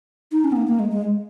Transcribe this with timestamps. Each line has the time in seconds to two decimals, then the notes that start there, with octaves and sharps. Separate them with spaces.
0.32 D#4
0.44 C#4
0.52 B3
0.56 A#3
0.67 A#3
0.80 G#3
0.91 G#3